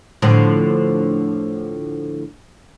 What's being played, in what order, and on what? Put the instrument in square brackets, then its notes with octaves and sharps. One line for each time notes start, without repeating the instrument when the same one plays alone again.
[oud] A2 D3 F3